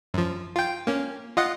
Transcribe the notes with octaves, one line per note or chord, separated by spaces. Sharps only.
F#2 F3
F4 G5
A#3 C#4
F4 D#5 F#5